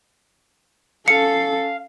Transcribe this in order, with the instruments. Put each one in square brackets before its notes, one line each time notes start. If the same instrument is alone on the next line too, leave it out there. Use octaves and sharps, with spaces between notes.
[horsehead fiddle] C#4 A4 [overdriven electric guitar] F5 [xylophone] C#7